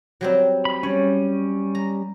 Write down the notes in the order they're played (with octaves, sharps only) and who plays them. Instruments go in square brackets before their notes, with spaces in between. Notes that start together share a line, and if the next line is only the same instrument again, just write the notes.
[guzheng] F#3 G3 C4
[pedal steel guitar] B5
[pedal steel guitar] G3 C#4 [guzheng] C#5
[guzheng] A#5